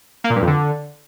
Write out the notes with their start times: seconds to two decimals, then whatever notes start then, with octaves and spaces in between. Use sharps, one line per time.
0.24 A#3
0.30 A#2
0.36 G2
0.41 F2
0.47 D3